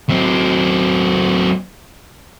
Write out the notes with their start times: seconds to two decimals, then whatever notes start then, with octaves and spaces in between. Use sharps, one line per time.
0.09 F#3 C4